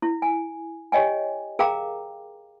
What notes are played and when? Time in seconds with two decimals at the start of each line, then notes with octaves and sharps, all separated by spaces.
0.02 E4
0.22 G#5
0.92 G4 C#5 D#5 G5 G#5
1.59 G#4 A#4 F5 G5 A#5 D6